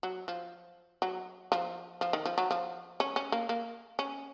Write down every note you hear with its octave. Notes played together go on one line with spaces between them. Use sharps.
F#3
F3
F#3
F3
F3
D#3
F3
F#3
F3
C#4
C#4
A#3
A#3
C#4